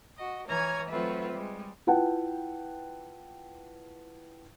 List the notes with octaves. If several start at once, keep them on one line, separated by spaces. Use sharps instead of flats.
F#4 D#5
E3 C#5 G#5 A#5 F6 G#6
F#3 A3 C4 F4 B4 E5
G3 G#3
E4 F4 B4 F#5 G5 A5